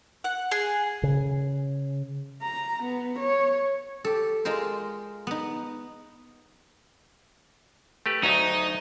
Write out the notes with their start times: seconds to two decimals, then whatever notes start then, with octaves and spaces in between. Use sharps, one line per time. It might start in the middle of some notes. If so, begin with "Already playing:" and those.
0.24 F#5
0.51 G#4
1.03 C#3
2.42 A#5
2.82 B3
3.18 C#5
4.05 G4 A4
4.45 G#3 F4 A#4 C5
5.27 B3 D#4
8.06 A3 G4 B4
8.23 D2 F#3 D#4 E5